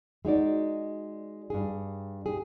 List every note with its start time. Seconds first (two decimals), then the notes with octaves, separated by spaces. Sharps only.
0.25 G#3 D#4 F#4 D5
1.50 G2 G#4
2.26 G4 G#4